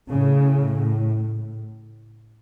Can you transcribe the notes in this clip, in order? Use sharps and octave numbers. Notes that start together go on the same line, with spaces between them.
A2 C#3